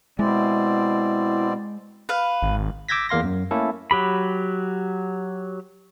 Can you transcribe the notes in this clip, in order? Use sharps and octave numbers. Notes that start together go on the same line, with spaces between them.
B2 G#3 C4 E4 D5
B4 F5
G#1
D6 E6 G6 G#6 A#6 B6
E2 A#3 F5 C6 A#6
F#2
A3 A#3 C#4 E4 A4
F#3 G4 B5